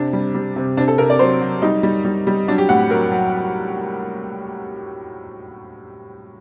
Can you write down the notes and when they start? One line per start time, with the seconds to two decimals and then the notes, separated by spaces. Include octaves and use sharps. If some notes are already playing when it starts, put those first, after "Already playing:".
Already playing: C3 D4
0.13 G3
0.34 G3
0.56 C3
0.77 C3 D4
0.88 A4
0.98 C3 A#4
1.10 D5
1.19 F#3 C5
1.41 F#3
1.62 G3 D#4
1.83 G3
2.05 G3
2.27 G3
2.48 F#3 D4
2.58 G4
2.69 A2 F#5
2.90 F#3 A#4
3.11 F#3